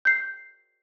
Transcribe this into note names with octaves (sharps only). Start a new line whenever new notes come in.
G6 C7